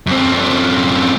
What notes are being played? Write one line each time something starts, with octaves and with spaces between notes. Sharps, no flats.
F#2 C4